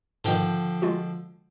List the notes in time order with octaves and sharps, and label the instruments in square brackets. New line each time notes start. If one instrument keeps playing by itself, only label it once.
[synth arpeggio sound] G#2 B2 D#3 [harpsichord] D3 F3 G5
[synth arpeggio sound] G#3 F4 F#4